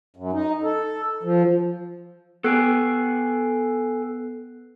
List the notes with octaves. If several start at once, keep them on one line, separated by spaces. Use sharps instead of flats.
F#2
D#4
A4
F3
B3 A4 G5 G#5 F#6 C7